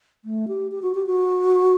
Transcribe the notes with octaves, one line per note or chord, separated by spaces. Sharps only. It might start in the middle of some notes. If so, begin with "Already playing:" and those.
A3
G4
G4
F#4
G4
F#4